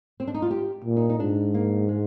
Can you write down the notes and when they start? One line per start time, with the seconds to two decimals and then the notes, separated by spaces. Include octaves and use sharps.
0.20 C4
0.27 D4
0.34 D#4
0.42 F4
0.51 G4
0.84 A#2
0.97 D#4
1.10 D#4
1.19 G#2 D4
1.54 A#3
1.88 G#3